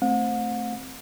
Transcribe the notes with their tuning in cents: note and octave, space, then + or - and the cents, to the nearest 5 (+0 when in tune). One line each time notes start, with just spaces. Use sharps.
A3 +0 C4 +0 F#5 -45